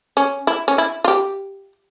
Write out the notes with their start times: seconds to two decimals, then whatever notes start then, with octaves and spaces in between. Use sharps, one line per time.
0.17 C#4
0.47 E4
0.68 C#4
0.78 E4
1.04 F4
1.08 G4